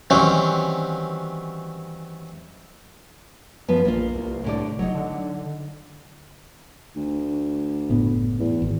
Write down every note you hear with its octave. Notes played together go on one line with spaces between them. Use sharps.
D#3 E3 F#3 G3 C4 C#4
F#2 F3 B3
A#1 A#3 F4
C2
A2 D3 D5
F1 F#3 D#4
D3
D2
F#1 A2 B3
E2
G#1